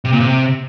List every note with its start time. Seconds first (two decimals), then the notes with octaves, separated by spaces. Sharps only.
0.05 C3
0.12 A#2
0.20 C3